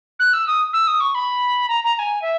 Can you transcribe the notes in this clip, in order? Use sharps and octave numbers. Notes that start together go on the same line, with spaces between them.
F#6
E6
D#6
E6
D#6
C#6
B5
A#5
A#5
A#5
G#5
E5